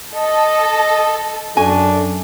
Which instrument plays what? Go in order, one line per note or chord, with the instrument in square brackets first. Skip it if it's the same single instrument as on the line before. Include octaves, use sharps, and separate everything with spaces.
[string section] A4 [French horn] D#5
[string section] F#2 [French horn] D4 [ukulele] F#4 G#5 [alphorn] A4